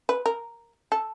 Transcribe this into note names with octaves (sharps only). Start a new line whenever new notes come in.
B4
A#4
A4